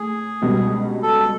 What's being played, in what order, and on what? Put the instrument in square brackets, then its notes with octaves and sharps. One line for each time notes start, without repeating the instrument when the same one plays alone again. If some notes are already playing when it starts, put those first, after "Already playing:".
Already playing: [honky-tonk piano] A2 [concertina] G#4
[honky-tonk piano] C#2 B2 G3 B3
[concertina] A4